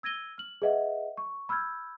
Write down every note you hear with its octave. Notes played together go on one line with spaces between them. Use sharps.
E6 G#6 A#6 D#7 G7
F6 F#7
G#4 B4 D#5 E5 F#5
C#6
B5 E6 F6 G6 G#6